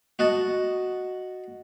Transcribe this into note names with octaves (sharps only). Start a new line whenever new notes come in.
F#4 D#5 F#5 A5